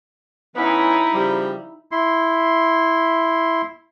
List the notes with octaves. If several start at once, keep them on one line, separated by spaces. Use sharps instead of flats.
E3 B3 C#4 D#4 E4
C#3 F3 G3
E4 C6